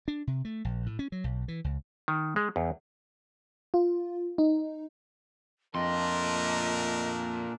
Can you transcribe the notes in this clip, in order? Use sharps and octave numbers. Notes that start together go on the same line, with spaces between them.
D4
C3
A3
A#1
A2
C#4
F#3
B1
E3
C#2
D#3
G#3
E2
F4
D#4
F2 A#2 A3 D4 A#4 D#5 C6